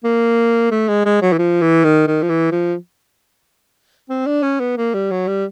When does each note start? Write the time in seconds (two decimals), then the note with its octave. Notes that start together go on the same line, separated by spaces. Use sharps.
0.04 A#3
0.71 A3
0.89 G#3
1.06 G#3
1.22 F#3
1.33 E3
1.39 F3
1.61 E3
1.84 D#3
2.07 D#3
2.22 F3
2.29 E3
2.52 F3
4.10 C4
4.27 D4
4.43 C#4
4.60 B3
4.77 A#3
4.94 G3
5.11 F#3
5.27 G3